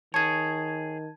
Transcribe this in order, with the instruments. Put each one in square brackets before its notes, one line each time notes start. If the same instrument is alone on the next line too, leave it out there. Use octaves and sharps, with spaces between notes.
[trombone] D#3 [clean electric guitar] G#4 C#5 [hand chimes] A5 G#6